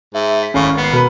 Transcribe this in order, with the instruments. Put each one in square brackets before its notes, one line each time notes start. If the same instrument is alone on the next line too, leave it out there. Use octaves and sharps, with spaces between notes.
[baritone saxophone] G#2 [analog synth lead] E5
[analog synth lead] B6
[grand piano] G#1 F5 C#6 [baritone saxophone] A2 [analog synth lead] C#4
[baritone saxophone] B3 [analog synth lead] C7
[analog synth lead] B2 [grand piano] A#4 B4